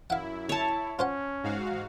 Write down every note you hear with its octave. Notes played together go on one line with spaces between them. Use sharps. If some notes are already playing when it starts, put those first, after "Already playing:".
F#2 E4 F5 F#5
C#5 A5
C#4 F4 C5 F#5
G#2 F#4 F5